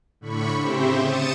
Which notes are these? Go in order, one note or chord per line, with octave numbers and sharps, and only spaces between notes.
A2 D3 B5 C#6
C#3 C4 G4 C5 E5
D#6 A6 C#7 D#7 E7